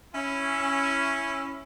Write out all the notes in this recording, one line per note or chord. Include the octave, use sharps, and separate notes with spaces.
C#4 E4